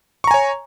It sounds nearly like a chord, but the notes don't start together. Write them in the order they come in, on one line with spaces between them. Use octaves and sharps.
C#6 A#5 G#5 C#5